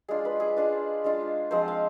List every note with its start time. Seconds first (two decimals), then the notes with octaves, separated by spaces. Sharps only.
0.08 G#3 D4 F4 G#4
0.25 B4
0.40 G#4
0.57 G#3 D4 F4
1.04 G#3 D4 F4
1.51 F3 G#3 C4 C5
1.68 F5